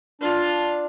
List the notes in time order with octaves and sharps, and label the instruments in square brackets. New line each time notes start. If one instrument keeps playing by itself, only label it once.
[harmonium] D4 [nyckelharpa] F4